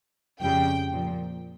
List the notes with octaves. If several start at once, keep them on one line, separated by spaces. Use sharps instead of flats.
F2 C#3 G3 G5
A#2 F3